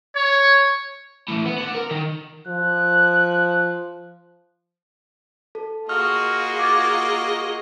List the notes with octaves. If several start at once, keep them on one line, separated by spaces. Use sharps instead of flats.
C#5
A2 E3
B3
D4 F#5
A#4
D#3
F3 F#6
A4
A#3 F4 F#4 G#4 D#5 F6
D6 G#6 A6